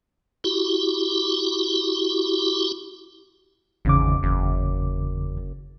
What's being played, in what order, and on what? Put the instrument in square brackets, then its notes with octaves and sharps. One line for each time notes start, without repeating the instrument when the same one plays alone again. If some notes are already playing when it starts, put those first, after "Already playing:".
[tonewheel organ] E4 F#4 G4
[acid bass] G#1 [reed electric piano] E2 C#3 D6
[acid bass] F#1